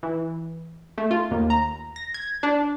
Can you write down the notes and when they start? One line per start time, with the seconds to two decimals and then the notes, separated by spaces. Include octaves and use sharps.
0.03 E3
0.98 A3
1.11 F4
1.31 D#2
1.50 A#5
1.96 A#6
2.14 G#6
2.43 D4